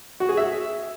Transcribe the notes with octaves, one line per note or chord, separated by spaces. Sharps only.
F#4
G#4
E5